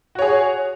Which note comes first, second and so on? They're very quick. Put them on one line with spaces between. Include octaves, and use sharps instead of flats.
F#4 C#5 G#4